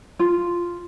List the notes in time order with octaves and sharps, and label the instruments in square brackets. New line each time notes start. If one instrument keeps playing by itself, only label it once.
[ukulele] F4